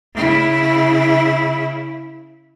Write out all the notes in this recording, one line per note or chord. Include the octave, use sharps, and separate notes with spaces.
C#3 E4